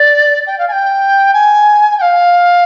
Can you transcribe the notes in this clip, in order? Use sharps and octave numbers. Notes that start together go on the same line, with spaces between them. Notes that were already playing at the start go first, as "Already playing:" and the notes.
Already playing: D5
G5
F5
G#5
G5
G#5
G5
F5